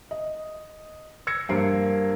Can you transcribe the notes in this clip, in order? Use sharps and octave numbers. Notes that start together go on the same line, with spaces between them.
D#5
E6 G#6 A#6 C#7
G2 A#3 C5 A#5 C7 D7